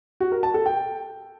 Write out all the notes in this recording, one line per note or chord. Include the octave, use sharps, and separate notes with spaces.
F#4
A#4
A5
A4
G5